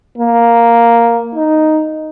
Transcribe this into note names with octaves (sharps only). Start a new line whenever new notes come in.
A#3
D#4